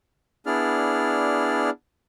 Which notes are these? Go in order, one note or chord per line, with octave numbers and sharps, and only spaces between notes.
B3 D4 E4 G#4 D5 F6